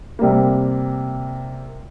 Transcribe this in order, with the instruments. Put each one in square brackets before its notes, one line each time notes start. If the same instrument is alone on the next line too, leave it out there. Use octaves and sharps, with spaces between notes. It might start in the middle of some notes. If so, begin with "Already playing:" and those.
[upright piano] C3 G3 A#3